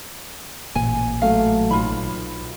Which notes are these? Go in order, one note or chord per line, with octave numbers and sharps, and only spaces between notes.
A1 A#2 A#3 G#5
F#3 A3 F5
B1 F4 B5